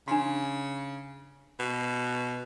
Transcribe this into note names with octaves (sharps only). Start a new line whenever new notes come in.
C#3 D4 C6
B2